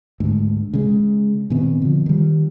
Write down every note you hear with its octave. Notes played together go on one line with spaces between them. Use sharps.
D2 G#2
C#3 G#3
A#2 D#3 B3 C4
D3 F3
D#3 G3